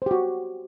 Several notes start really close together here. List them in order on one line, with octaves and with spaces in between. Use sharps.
C5 G4 F#4